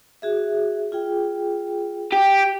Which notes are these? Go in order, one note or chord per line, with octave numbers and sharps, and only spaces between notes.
F#4 G#4 E5
F4 G#4 G5
G4